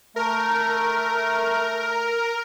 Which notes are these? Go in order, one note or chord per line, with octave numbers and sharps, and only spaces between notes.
A3 A#4